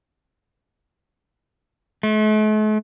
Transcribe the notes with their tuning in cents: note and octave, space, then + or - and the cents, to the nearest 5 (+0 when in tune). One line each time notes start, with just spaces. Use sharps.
A3 -45